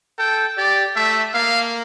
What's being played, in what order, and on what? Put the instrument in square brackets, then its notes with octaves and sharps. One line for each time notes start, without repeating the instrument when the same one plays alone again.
[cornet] A4 [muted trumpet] G5
[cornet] G4 [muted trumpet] D5
[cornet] A3 [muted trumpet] E5
[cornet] A#3 [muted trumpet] F5